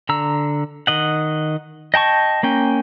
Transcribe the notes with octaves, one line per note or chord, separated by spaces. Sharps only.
D3 A#5 E6
D#3 D#5 F#5
D#5 G5 A5 C#6
A#3 C#4 G5